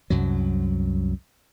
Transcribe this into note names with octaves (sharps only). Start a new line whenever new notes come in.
C2 F#2 F#3